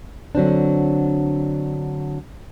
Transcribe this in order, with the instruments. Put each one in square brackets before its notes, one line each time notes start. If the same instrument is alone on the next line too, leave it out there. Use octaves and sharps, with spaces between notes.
[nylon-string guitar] D3 F#3 C4 D4